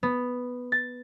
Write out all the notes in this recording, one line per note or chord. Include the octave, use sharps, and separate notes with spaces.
B3
A6